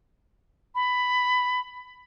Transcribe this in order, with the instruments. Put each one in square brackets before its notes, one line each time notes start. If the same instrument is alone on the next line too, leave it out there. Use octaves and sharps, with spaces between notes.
[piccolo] B5